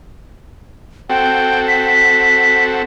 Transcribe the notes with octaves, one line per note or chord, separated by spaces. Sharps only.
C4 F#4 A4 G5
B6